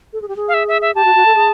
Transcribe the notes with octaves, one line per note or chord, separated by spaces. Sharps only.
A4
G#4
G4
G#4
F5
E5
E5
E5
G4 A5
F#4
F#4
A4
G#4